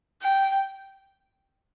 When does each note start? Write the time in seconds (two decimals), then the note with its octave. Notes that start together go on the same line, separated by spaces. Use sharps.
0.22 G5